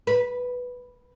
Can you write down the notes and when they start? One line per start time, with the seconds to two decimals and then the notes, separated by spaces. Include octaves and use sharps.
0.07 B4